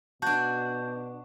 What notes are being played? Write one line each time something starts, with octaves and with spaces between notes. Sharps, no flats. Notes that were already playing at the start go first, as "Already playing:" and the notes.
B2 D4 F#4 A5 G6